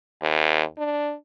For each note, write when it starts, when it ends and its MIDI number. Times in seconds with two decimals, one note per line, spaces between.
0.22 0.63 39
0.78 1.14 62